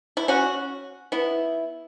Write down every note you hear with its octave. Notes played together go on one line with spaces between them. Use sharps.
E4
C#4 F#4
B3 E4